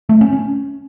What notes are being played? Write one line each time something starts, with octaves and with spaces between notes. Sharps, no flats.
A3
C#4
C#4